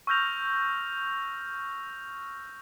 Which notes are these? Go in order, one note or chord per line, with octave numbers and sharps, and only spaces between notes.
C#6 E6 F6 G6 A#6 F7